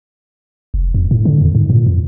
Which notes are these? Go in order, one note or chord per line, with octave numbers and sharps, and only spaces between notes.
F1
F2
A2
D3
E2
G#2
A#2
F2